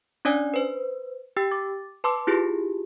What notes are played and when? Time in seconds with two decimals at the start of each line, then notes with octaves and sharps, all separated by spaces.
0.25 C#4 D4 C#5 D5 G#5
0.54 B4 C5
1.37 G4 G5 E6
1.51 D6 A6
2.04 B4 A5 C6 D6 E6
2.27 E4 F4 G4 G#4